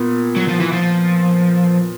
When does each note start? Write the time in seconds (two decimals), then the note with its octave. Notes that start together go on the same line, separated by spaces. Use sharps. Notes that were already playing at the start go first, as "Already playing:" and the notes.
Already playing: A#2 B3
0.36 F#3
0.48 F3
0.60 E3
0.73 F3